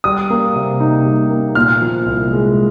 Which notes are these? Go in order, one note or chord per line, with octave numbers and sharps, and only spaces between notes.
G3 D#6
A#3
C3
D#4
G3
A#3
A#2 F6
F3
C2
G#3